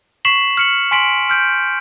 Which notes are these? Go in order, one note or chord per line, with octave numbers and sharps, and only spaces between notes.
C#6 B6 C7 E7 F#7
F6 C#7 F#7
G#5 C6 B6 D7 F#7
F6 G6 D7